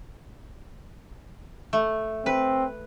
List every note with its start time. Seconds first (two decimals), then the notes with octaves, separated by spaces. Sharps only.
1.73 A3
2.26 C4 B4